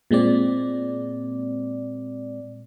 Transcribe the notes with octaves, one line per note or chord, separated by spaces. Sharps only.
A#2 G#3 C4 D5